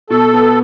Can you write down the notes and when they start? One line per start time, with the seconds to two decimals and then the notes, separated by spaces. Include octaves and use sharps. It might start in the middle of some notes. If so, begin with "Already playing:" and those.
0.10 B2 A4
0.33 B3